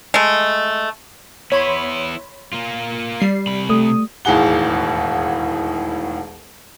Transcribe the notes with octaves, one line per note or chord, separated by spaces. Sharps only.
G#3 A3
B3 E4 C#5 B5 C6
A#3 F4
G3 C7
C3 B5
A3 D#6
E1 D#2 A2 G#4 F#5 G7